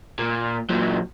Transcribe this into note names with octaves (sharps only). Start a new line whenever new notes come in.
A#2
A#2 F#3